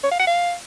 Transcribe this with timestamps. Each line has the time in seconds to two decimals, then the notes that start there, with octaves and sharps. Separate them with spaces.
0.04 C#5
0.12 F5
0.19 F#5
0.27 F5